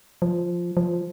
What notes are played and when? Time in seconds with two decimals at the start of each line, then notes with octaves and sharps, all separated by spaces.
0.22 F3
0.77 F3